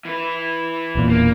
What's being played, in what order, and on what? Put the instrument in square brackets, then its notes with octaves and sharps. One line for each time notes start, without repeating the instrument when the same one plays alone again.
[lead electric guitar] E3 B4
[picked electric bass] E1 E2 A#2
[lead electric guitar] A#3